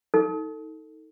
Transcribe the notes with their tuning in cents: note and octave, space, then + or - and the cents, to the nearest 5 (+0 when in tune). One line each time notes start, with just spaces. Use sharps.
D#4 +25 A4 +20